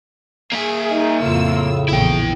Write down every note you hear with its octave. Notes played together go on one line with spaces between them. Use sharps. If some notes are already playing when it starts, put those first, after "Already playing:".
A#3 G#4 E5
D#4
F2 A2 C#3 F4 E6
A#1 E2 E4 G5